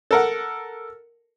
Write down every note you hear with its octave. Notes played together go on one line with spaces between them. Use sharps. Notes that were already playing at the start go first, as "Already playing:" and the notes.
A4 A#4 F#5